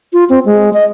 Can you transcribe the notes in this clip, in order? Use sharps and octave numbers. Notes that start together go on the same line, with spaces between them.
F4
C4
G#3
D#5